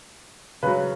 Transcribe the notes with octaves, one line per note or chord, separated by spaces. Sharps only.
C#3 F#3 B4